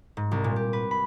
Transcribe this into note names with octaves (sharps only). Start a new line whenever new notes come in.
G#2
C2
A#2
G4
B4
B5